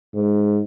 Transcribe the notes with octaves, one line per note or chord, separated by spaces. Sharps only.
G#2